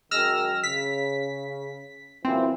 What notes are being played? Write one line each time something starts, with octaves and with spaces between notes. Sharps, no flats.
F#2 D#3 G#3 E6 F6 A#6
C#3 B6
F#2 A#2 E3 C4